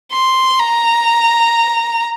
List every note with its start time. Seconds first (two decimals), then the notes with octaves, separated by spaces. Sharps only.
0.13 C6
0.59 A#5